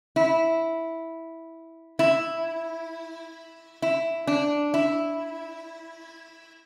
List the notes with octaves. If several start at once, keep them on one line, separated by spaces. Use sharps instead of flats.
E4
E4
E4
D4
E4